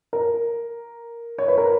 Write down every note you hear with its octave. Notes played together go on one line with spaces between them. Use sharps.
A#4
C#5
B4
A#4